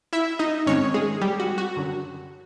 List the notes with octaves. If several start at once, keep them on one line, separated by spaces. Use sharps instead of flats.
E4 E5
D#4 D#5
G#2 D#3 G#3 C4 C#4 C#5
G#3 G#4
G3 G4
F#4
F#4
F#2 D3 F#3